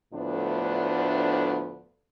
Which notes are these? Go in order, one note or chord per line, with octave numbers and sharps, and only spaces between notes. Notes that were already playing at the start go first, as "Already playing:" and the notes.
D2 A2 D3 F3 B3 D4